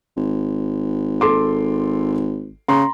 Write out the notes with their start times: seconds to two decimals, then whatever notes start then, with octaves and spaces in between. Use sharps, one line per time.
0.16 G#1
1.21 A4 C6 D6
2.68 C#3 A#5 C6